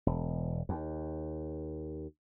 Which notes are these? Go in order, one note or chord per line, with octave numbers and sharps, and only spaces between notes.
E1
D#2